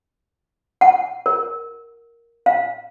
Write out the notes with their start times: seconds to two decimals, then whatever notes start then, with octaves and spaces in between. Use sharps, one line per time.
0.81 F#5
1.26 A#4
2.46 F5